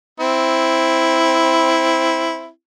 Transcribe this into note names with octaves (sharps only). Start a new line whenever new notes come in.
C4 E4